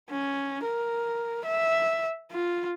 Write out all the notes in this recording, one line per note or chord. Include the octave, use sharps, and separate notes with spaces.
C#4
A#4
E5
F4